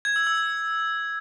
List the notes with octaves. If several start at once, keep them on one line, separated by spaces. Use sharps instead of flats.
G#6
E6
E6
G#6